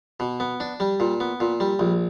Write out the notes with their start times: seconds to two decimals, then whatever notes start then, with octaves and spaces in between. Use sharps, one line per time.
0.20 B2
0.40 B3
0.60 D4
0.80 G3
1.00 A#2
1.20 B3
1.40 A#2
1.60 G3
1.79 A#1